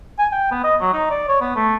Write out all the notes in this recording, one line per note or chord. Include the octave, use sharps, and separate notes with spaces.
G#5
G5
B3
D#5
F#3
D#4
D5
C#5
B3
A3